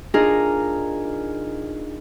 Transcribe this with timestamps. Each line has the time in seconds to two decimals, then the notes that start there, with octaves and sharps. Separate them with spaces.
0.14 D4 D#4 F4 G#4 A#4 D#5